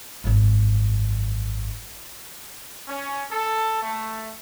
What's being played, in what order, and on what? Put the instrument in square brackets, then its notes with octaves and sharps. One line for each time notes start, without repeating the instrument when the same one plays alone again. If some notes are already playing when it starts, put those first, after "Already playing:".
[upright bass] G#1 F#2
[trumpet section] C#4
A4
A3